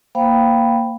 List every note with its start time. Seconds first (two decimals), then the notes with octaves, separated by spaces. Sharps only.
0.15 A#3 C5 F5 G5 B5